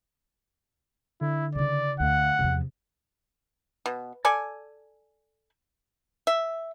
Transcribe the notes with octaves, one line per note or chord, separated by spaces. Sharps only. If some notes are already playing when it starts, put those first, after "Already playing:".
D3 E4
C#3 E4 D5
D2 D3 A3 F5 F#5
E2 C3 F3
B2
A4 D5 G#5
E5